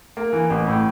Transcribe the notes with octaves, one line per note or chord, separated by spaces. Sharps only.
A#3
E3
A1
A2